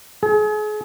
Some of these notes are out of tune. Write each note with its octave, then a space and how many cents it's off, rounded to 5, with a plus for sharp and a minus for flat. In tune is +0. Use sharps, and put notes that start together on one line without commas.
G#4 +35